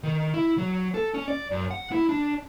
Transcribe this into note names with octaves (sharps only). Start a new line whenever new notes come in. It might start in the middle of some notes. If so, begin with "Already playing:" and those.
D#3
E4
F#3
A4
C#4
D5
F#2
F#5
E4
D4